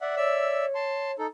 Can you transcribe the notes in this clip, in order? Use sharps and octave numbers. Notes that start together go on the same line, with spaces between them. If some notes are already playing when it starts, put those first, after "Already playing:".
D5 E5 F#5
C#5 D5 E5 E6
A5 C6
D#4 A4